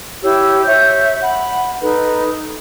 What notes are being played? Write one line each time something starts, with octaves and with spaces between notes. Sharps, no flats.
E4 G4 C#5 E6
C#5 E5 G6
F#5 B5
D#4 A4 B4